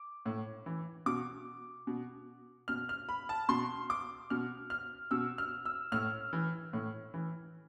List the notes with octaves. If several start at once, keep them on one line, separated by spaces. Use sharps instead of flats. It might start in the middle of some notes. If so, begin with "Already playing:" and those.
Already playing: D6
A2
E3
B2 D6
B2
B2 F6
F6
B5
A5
B2 C6
D6
B2 F6
F6
B2 E6
F6
E6
A2 F6
E3
A2
E3